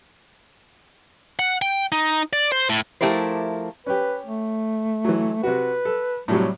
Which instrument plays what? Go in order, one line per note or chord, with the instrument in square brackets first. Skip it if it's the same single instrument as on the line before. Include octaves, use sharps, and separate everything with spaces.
[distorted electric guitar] F#5
G5
D#4
D5
C5
A2
[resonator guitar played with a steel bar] F3 A3 E4 G4 A#4 C5
[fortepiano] C#4 G4 [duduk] B4
[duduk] A3
[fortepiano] E3 F#3
[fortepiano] C3 F#4 [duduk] B4
[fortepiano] A4
[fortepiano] A2 C3 F#3 [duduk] G3